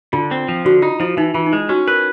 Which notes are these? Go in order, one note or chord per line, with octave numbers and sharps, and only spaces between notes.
D3 F4
C4
F3
D3 F#4
D#4 F4
F3 E4
E3 D#4
E3 F4
D#4
G#3 E4
C#4 F#4
A#4 B4